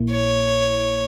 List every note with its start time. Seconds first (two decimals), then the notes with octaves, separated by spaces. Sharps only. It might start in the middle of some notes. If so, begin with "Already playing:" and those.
Already playing: A#1 A#2 A#3 E4
0.11 C#5